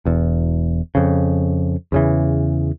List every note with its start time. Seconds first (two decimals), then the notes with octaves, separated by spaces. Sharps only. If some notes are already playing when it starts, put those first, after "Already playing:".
0.05 E1 E2
0.95 F2 C#3
1.92 E2 C#3 E3